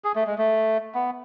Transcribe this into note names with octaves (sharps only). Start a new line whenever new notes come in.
G#4
A3
G#3
A3
B3